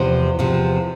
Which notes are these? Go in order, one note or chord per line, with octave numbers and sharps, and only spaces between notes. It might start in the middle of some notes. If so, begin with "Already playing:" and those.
Already playing: E2 C3 F3 C5
E2 C3 F3